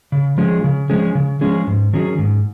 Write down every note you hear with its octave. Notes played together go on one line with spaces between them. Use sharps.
C#3
F3 G#3 C#4 G#4
C#3
F3 G#3 C#4 G#4
C#3
F3 G#3 C#4 G#4
G#2
D#3 F#3 C#4 G#4
G#2